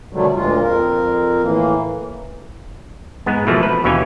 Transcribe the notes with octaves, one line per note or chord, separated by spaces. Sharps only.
B2 D3 D#3 F#3 G3 A3
D2 A#2 G#3 F4
F2 C4 A#4
A2 E3 A#3
G#2 G#3 B3
B2 E3 F3 A3 A#3
B4
D#2 B2 E3 C#4 G4 G#5